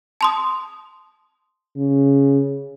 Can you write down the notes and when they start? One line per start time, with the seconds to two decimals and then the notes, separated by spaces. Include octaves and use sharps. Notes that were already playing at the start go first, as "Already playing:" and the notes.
0.21 A5 C6 D#6
1.76 C#3